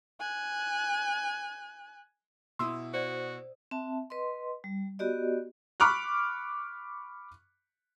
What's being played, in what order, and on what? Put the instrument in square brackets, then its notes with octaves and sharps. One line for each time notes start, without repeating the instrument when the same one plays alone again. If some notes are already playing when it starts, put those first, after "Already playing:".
[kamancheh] G#5 F#6
[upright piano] B2 E4 D#6 [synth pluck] C6 E6
[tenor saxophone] F#4 [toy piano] C5 D5
[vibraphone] C4 E5 A5
B4 D#5 C6
G3
B3 F#4 G4 D5 D#5
[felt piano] B5 C#6 D6 F6 F#6